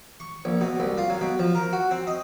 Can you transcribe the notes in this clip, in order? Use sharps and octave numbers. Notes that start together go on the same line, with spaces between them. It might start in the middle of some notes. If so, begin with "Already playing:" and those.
C#6
A#1
B2
C2
F4
F#3
B2
F3
A#4
F#4
C4
D#5